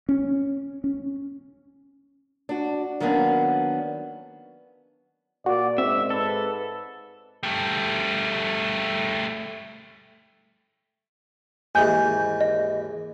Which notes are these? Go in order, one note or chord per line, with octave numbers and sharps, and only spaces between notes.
C#4
C#4
D4 F#4
D#3 F#3 A#3 B3 C#4 D4
A#2 F#4 D5
G#2 C4 D5 E5
A4 B4
G3 A3
D#2 G#2 E3 G#5 G6
D#5